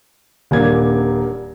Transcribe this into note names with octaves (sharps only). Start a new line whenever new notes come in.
D#1 A#3 D4 G#6